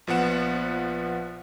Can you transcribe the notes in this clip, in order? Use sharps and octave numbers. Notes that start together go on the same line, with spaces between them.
A#1 F3 B3 F#5 E7